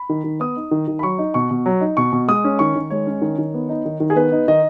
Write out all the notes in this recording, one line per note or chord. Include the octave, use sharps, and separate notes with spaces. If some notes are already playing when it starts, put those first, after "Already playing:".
Already playing: B5
D#3
D#3
B3 D#6
D#4
D#3
D#3
B5
F#3 C#6
D#4
B2 C#6
B2
F#3
D#4
B2 C#6
B2
G#3 D#6
C#4
D#3 C#6
D#3
G#3 C#5
C#4
D#3
D#3
B3
D#4
D#3
D#3
G#4
B3 B4
D#4
D#3 D#5